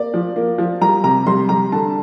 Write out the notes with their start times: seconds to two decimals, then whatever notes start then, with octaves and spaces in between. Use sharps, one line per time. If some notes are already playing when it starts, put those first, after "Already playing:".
Already playing: A#3 D5
0.14 F3
0.36 A#3
0.58 F3
0.81 G3 A#5
1.04 C3 A#5
1.27 G3 C6
1.49 G3 A#5
1.72 D3 A5